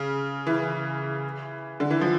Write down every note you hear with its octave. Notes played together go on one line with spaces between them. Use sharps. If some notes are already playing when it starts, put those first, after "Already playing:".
Already playing: C#3
E3
D3
E3
F3